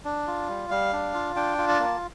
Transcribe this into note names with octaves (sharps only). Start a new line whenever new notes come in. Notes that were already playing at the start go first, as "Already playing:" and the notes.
D4
F4
G3
G3 F5
D4
F4
D4 G5
F4
A5
A#3